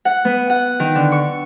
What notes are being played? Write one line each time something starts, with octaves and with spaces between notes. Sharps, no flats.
F#5
B3
F#5
D#3
D3
C#6